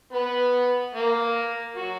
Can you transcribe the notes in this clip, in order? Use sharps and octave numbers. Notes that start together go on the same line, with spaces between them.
B3 B4
A#3 A#4
F#3 F#4